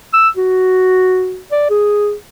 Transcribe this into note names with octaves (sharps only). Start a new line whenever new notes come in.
E6
F#4
D5
G#4